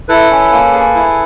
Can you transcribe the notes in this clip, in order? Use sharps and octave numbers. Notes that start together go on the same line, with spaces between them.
E4 A4 B4
C#4
A#3
G#4
E4